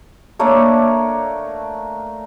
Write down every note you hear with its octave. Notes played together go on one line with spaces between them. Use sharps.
A3 A#3 D4 C#5